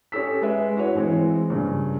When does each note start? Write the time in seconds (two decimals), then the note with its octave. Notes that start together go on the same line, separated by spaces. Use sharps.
0.12 C#4 G4 A4 E6 B6
0.42 G#3 B4 E5
0.76 E4 F#4 B4 C#5
0.95 E3 G#3 C4
1.50 G2 A#2 C#3